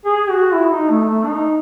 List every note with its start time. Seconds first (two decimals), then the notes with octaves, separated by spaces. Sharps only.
0.06 G#4
0.30 F#4
0.54 E4
0.72 D#4
0.90 A3
1.08 A3
1.26 D#4